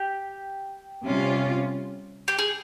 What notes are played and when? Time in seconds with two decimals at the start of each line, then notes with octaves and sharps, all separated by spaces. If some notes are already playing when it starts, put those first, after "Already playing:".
Already playing: G4
1.05 C3 G3 C#4 F4
2.28 G4
2.39 G#4